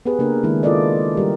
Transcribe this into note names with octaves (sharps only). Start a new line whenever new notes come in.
B3 G4 G#4 B4
C#3 A#3 D4 A#4
D#3 G#3 E4
E4 F4 A4 D5 D#5
G3 G4 A#4